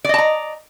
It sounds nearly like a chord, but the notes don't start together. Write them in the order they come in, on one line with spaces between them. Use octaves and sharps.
D5 D#5 A5 A#5